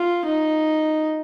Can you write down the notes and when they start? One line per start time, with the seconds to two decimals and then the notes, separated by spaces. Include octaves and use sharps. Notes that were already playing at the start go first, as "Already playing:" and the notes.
Already playing: F4
0.25 D#4